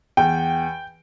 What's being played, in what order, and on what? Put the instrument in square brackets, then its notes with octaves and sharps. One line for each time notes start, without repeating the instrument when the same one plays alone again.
[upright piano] E2 G5